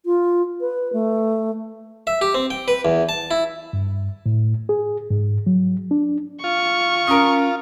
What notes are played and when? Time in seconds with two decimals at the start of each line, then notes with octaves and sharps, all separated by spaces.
0.06 F4
0.61 B4
0.93 A3
2.07 E5
2.21 G4
2.34 C4
2.50 G5
2.68 B4
2.85 E2
3.09 A5
3.31 E4
3.73 G2
4.26 A2
4.69 G#4
5.10 G#2
5.47 F#3
5.91 D4
6.44 F4 C#6
7.07 C#4 A#4 D#6